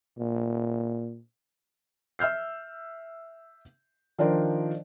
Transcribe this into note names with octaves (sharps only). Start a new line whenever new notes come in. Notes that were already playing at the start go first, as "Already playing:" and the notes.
A#2
E5 E6 F6 G6 C7
D#3 F3 D4 D#4 A#4 C5